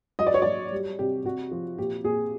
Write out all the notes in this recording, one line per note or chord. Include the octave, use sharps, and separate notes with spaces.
F#3 D#5
D5
C#5
F#3 D5
G3
C3 G4
C3 F#4
F3
A#2 G4
A#2 G#4